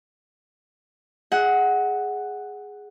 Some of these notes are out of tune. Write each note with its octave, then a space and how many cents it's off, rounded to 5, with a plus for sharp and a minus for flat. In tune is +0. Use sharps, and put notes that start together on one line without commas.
G#4 +0 D#5 +45 F#5 +0